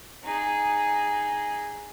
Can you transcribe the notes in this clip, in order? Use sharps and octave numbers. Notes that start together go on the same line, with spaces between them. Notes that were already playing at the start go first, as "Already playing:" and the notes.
D#4 G#4